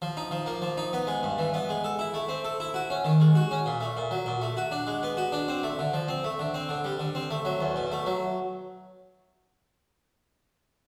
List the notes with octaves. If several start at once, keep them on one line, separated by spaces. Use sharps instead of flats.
F3
D#4
F3
A#3
F3
D#4
B3
G#3
G2
E3
B3
G#3
A4
E4
A3
C4
A4
E4
F#4
C#4
D#3
G#3
F#4
C#4
A#2
A3
A#2
F#3
A#2
A3
F#4
D4
G#3
B3
F#4
D4
C4
A3
D3
F3
C4
A3
D3
C4
D3
G3
D3
C4
A3
F#3
E2
B2
A3
F#3